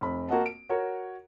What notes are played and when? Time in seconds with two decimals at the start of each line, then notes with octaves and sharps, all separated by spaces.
0.01 F1 B5
0.29 A#3 F#4 A#4 D#5 F#5 A5
0.46 D7
0.69 F#4 A#4 C#5